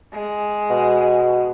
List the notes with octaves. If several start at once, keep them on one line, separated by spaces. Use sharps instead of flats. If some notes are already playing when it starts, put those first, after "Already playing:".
G#3
B2